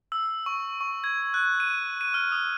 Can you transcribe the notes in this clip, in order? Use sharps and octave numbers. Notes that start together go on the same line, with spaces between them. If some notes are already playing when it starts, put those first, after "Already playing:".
E6
C#6
C#6
G#6
F#6
D#7
D#7
F6
D#6